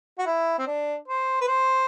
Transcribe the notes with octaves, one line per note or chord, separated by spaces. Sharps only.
F#4
E4
C4
D4
C5
B4
C5